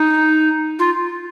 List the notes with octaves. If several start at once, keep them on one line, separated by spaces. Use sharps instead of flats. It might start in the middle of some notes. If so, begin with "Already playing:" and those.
Already playing: D#4
F4